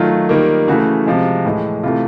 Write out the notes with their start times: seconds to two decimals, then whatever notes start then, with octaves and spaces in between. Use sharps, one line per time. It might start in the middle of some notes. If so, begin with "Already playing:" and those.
Already playing: D#3 F#3 A3 F4
0.29 D#3 G3 A#3
0.68 C#3 E3 A3 F#4
1.06 C3 F3 G#3
1.45 A2 E3 G#3
1.83 C3 E3 A3 F4